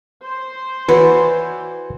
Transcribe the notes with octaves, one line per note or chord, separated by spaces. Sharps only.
C5
E3 F#4 B4 C#5 D5